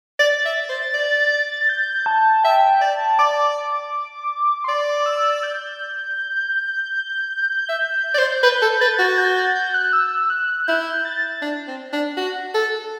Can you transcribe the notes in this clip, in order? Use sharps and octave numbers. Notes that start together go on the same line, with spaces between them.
D5 A6
E5
C5
D5
G6
A5
E5 G5
D5 A5
D5 D6
C6
D5 D6
E6
G6
E5
D5
C5
B4 G6
A4
B4 A6
F#4
G6
A6
G6
F#6
E6
F#6
E4 G6
A6
D4
C4
D4
F#4
A4